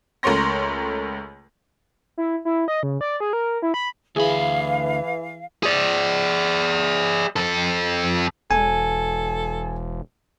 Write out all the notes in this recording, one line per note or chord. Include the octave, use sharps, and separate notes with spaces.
C#2 A3 A#4 C#5 C6 A#6
E4
E4
D#5
C#3
D5
G#4
A#4
E4
B5
D2 E3 G#4 F5 B5
G#4 D5
F2 A4
E1 A4 G#5